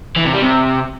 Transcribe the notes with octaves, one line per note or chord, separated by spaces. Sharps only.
E3
C3
G3
C3